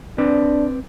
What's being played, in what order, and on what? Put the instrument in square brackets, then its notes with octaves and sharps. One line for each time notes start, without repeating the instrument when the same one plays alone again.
[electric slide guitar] C4 B4 D5 [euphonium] D4